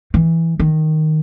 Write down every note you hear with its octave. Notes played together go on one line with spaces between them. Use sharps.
E3
D#3